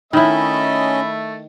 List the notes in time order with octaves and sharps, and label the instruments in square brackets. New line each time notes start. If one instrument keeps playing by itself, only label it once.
[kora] D#3 E4 [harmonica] A3 E5 [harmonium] C#4 D#5 [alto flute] B5